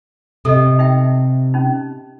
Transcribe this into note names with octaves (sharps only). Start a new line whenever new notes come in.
C3 A4 D#5
D#4 E5 G5
C#4 D#4